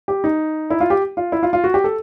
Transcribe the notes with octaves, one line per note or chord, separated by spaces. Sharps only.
G4
D#4
E4
F4
G4
F4
E4
F4
F4
F#4
G4
A4